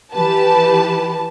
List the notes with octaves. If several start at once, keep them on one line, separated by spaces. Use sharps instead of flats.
E3 G4 B4 A5